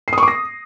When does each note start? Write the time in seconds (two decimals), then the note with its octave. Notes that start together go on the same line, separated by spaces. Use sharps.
0.08 C7
0.13 D#6
0.18 C#6
0.23 D6
0.28 A#6